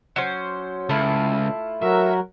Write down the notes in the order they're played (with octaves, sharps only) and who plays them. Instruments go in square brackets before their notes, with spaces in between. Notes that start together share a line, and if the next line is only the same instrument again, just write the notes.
[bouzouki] F#3 C#4 C5
[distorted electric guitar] C#2 [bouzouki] A3 E4 F4
[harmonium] F#3 F#4 A#4 [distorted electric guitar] E5